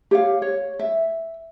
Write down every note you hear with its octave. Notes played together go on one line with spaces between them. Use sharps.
G4 C#5 F5
C#5
E5